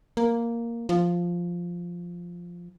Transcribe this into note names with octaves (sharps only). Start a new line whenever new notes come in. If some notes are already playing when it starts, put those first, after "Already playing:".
A#3
F3